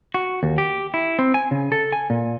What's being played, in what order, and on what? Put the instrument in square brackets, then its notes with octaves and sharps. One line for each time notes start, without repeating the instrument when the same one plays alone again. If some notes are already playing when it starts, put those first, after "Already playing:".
[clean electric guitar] F#4
D#2
G4
E4
C4
G#5
C#3
A4
G#5
A#2